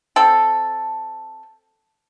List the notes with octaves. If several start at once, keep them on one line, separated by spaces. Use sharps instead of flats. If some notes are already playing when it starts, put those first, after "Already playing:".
C4 A4